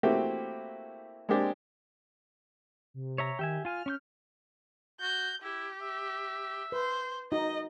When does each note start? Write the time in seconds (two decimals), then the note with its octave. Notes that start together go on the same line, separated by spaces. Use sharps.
0.03 A3 A#3 C4 E4 F#4 G4
1.29 G#3 A#3 C4 D4 G4
2.94 C3
3.18 C#5 E5 A#5
3.39 D#3 G4 E5 G#5
3.65 F4 G#5 F6
3.86 C#4 C#6 G6
5.01 F#4 G6
5.43 E4 G4
5.82 E5
6.72 B4 C5
7.32 D#4 F#4 D#5